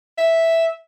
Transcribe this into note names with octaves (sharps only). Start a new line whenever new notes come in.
E5